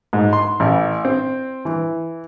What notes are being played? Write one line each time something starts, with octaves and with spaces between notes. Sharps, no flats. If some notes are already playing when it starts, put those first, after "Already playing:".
G#2
C6
A1
C4
E3